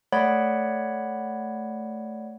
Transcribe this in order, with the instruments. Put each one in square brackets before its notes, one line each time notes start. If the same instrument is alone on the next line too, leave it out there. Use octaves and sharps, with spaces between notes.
[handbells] A3 C#5 D5 F#5 B5